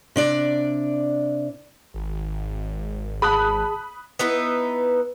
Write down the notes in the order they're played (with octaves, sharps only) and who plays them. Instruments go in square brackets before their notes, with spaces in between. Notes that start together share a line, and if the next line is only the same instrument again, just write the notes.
[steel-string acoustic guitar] C3 D4 D5
[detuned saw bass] G#1
[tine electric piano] G#4 A5 [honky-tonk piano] B5 D#6 F#6
[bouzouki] B3 D#4 E4 B4